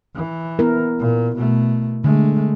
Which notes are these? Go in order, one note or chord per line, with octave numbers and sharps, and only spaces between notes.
E3
B3 E4 A#4
A#2
B2 A3
D3 G#3 A3